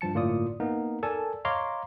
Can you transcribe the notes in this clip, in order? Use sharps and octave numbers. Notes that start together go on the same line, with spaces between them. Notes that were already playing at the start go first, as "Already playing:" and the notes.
G2 F3 A5 C#7
G1 A2 A#3 F4 D5 D#6
A#3 B3 D#4 A#4
A4 A#4 D5 G#5 A5
C#5 D#5 F5 A#5 C6 D6